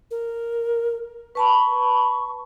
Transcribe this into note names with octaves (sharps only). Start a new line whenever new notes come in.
A#4
B4 A5 B5 C#6